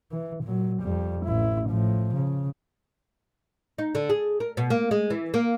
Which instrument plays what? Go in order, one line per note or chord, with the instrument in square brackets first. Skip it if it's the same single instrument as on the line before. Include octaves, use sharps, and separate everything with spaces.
[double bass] E3
A#2 F#3
F2 G3
A1 E4
A2 F3
C#3
[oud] D#4
D3
G#4
A#4
B2
A#3
G#3
E3
A#3